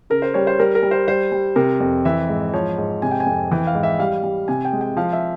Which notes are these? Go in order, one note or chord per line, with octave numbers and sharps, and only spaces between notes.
C#3 A#4
C5
G3 C#5
C5
G3 A#4
A#4
G3
C5
G3 C5
G3
C3 A#4
F2
E3 E5
G#2
F3 C#5
G#2
C3 G#5
G5
G#5
F2
E3 G5
F5
G#2
E5
G3 F5
G3
C3 G#5
G5
G#3
G5
F3 F5
E5